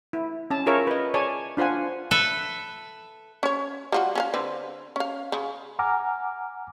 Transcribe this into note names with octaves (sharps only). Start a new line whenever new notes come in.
E4
C#4 A5
F4 G#4 A#4 C#5 E5
B4 D#5
G#4 C#5 D5 G#5 A5
D4 F4 C5 F#5 G#5
A4 B4 E5
C#4 C#5
G3 F4 F#4
C#4 G#4 F5
D3 C4 B4
C#4 F5
C#3
F#5 G#5 A#5 D6 F6